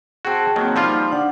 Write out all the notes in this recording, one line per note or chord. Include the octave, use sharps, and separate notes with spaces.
C4 F#4 G#4 G5 A5
D#3 F#3 A#3 C4
F3 G3 D#4 F4
D4 D5 F#5